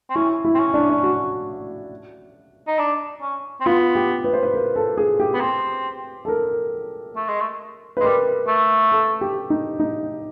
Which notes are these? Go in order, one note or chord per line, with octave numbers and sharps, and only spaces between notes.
C4
C#4 E4
E4
C4
C#4
D4
D4
F#4
D#4
D4
C#4
C4
B3 F4
G4
B4
C5
B4
A#4
A4
G#4
G4
B3
C4
A4
A#4
A3
G#3
A3
B4
G#3
G3 A#4
A3
A4
G4
D#4
D#4